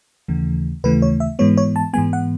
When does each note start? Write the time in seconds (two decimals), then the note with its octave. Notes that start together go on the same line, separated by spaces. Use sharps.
0.28 D#2 C#3 E3 A3
0.84 D#2 C#3 E3 A3 B4
1.02 C#5
1.20 E5
1.39 G#2 E3 G#3 B3 C#5
1.58 C#5
1.76 A5
1.93 G#2 E3 G#3 B3 G#5
2.13 F#5